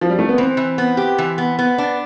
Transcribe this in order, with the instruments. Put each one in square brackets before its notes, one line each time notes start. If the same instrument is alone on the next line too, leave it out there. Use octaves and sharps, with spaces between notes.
[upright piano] F3
G3
A3
B3
[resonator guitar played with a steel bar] E3 [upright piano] C4
[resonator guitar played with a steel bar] E3
B3
G4
E3
B3
B3
D4